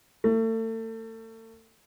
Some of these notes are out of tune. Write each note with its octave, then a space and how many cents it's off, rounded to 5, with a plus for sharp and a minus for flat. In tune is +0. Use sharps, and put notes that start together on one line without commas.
A3 +35